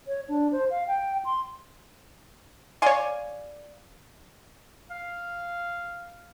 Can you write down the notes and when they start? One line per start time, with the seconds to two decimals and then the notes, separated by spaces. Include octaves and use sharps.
0.08 C#5
0.29 D4
0.52 C5
0.71 F5
0.88 G5
1.25 C6
2.82 C#5 D5 F5 G#5 C6
4.90 F5